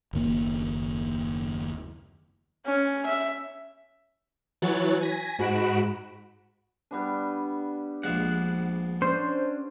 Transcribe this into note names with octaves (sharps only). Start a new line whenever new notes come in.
F#1 D#2 A#3
C#4
E5
E3 F#3 C#5 F#6 A6
G#5 A#6 B6
G#2 F#4 B5 F#6 D7 E7
G3 B3 D4
A#1 F3 G#3 F#5
C#4 D4 C5